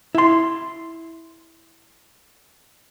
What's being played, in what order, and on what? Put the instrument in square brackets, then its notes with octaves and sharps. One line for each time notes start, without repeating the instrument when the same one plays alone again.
[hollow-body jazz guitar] E4 C6